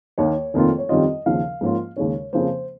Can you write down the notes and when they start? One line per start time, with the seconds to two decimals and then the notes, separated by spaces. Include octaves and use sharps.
0.18 D#2 D#3 A#3 C#5
0.54 F1 F2 D#3 A#3 F4
0.78 C#5
0.89 F2 D#3 G3 C#4 F4 D#5
1.26 D#2 C#3 F3 F5
1.61 G#2 F3 A#3 C#4 F4
1.97 D#2 C#3 G#3 C#4 C#5
2.33 F2 C#3 F3 A#3 C5